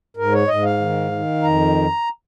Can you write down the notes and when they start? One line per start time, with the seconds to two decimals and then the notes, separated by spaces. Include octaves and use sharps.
0.17 G#2 A#4
0.33 C#5
0.48 G#2 D#5
0.64 F5
0.80 D#3
1.11 D#3
1.43 F2 A#5